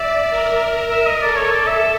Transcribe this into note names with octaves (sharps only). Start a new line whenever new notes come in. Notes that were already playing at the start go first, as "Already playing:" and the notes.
Already playing: D5 E5
A#4
E5
D#5
A4 D5
C#5
D5
A4 E5